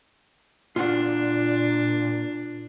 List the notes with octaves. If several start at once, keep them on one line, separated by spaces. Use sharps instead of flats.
A#2 D4 F4 F#5